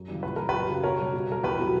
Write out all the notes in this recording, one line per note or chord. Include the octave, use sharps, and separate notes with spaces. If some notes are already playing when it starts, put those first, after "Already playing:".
Already playing: F#2
C#3 E3 G3
A#2 B4
G3 A#4
F#2 G4 B4
C#3 F#3
B2 A#4 C#5
G3
B2
G3 A#4
E2 G4 B4
B2 F#3